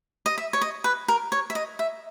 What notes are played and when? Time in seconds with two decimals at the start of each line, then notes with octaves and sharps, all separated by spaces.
0.26 D#5
0.38 E5
0.53 C#5
0.61 D#5
0.84 B4
1.08 A#4
1.32 C#5
1.50 E5
1.55 D#5
1.79 E5